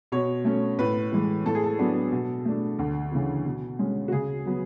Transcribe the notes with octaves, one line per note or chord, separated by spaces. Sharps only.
B2 C#5
A3 C#4
A2 B4
E3 G#3
A2 A4
G#4
A4
F#3 B3 D4
B2
A3 D4
D2
C#3 E3
B2
G#3 C#4
F#4
C#3 G#4
F#3 B3